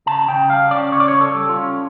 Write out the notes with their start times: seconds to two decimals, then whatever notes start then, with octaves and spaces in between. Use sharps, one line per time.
0.06 C#3 A5
0.28 C#3 G5
0.49 G3 F5
0.71 C#4 D5
0.92 C#3 C#5
1.00 D5
1.08 C#5
1.13 C#3
1.21 A4
1.35 G3
1.49 F4
1.56 C#4